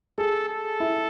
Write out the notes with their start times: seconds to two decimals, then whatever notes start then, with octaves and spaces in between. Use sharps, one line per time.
0.18 G#4 A4
0.49 A4
0.80 E4